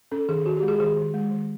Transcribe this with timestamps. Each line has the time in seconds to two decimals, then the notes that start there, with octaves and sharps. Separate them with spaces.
0.12 C#4 A4
0.29 D#3 G#4
0.46 D#3 F#4
0.57 G4
0.63 G#3
0.68 G#4
0.80 D#3 G#4
0.97 D#3
1.14 G#3
1.31 D#3